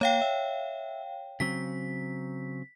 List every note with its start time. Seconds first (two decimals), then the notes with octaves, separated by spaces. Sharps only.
0.01 A#3 C#5 F5 G5
0.22 E5
1.40 C#3 F#3 C4 B6